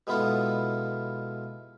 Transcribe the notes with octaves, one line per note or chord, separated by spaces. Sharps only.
B2 G#3 B3 E4 F4 A4